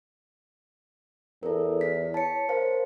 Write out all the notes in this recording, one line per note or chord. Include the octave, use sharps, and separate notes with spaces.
E2 A4 A#4
E4 B6
C#5 A5 C#7
A#4 C5 F5